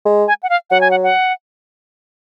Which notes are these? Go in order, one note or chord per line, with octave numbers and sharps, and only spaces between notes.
G#3
G#5
F#5
F5
F#3 F#5
G#5
F#5
F#5